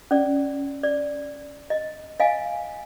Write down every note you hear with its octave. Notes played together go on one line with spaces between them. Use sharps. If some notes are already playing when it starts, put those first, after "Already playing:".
C#4 D5
D5
D#5
D#5 F5 G#5